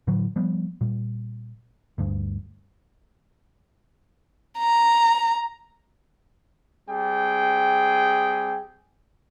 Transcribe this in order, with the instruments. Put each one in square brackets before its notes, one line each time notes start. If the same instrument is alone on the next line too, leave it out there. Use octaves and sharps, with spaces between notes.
[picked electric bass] A2 D3 E3 F#3
F3 G3 B3
A#2 G3
G1 D2 G2
[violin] A#5
[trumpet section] G3 C4 G#4 G5